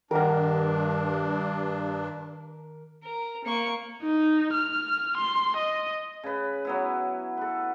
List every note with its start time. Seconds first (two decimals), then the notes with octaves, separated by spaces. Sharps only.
0.11 G2 D#3 D4 A#4 F#5 A#5 F6
3.03 A#4
3.45 A#3 C#6
4.03 D#4
4.53 F6
5.18 C6
5.57 D#5
6.24 C#3 B4
6.65 F#3 B3 E4
7.37 A4 B4